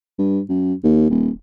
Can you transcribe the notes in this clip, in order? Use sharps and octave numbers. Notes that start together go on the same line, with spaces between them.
G2
F#2
D#2
D#1